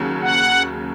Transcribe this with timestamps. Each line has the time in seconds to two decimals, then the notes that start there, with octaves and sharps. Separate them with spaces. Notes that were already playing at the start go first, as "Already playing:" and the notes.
Already playing: D#2 C#3 F#3
0.22 F#5